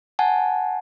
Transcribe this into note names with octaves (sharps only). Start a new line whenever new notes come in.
F#5 G#5 A5